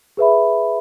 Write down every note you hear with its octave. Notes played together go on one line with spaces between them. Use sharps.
G#4 B4 E5 B5